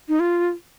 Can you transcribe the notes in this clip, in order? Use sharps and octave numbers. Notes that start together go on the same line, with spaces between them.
D#4
F4